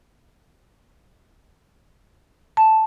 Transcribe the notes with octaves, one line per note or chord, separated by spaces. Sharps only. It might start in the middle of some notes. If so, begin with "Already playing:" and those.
A5